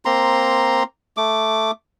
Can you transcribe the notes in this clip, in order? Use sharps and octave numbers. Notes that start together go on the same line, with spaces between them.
A#3 C4 A#5 C6
A3 D6